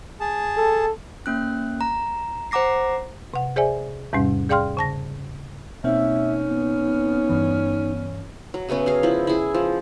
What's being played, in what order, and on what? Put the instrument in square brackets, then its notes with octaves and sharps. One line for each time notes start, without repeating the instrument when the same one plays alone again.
[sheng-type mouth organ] G#4 A5
[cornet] A4
[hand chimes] A#3 C#4 F#6
A#5
C5 F#5 A#5 D6 A#6 C7
[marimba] C3 F#5
G#4 C5 D5 E5 G#5
E2 G#2 C3 G3 C#4
G#4 D5 F5 G5 C6 F6
C#3 A5 A#6
[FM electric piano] B2 A#3 C4 [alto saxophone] C#4 [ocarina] D#4 [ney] E5
[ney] B3
[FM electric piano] G2 E3
[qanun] F#3
C#3 A3 B3 C#4
F#3 G#4 F5
F3 E4
E4 G#4
F3